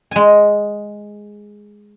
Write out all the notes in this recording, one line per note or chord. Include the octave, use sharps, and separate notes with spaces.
G#3 G#5